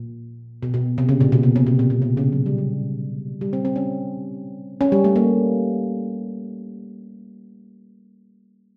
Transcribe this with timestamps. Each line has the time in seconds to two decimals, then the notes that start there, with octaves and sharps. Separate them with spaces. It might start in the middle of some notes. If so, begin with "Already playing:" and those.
Already playing: A#2
0.63 B2
0.74 B2
0.98 C3
1.09 C#3
1.21 A#2
1.32 B2
1.43 C3
1.56 C3
1.67 B2
1.79 A#2
1.90 B2
2.02 C3
2.17 C#3
2.32 F#3
2.46 G3
2.58 F#3
3.41 G3
3.53 C4
3.65 C4
3.76 C#4
4.81 C#4
4.92 G3
5.04 A3
5.16 A#3